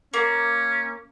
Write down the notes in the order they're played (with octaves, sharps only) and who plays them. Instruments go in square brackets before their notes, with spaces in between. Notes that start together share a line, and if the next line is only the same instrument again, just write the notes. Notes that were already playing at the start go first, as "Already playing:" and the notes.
[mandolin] A#3 [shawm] C#4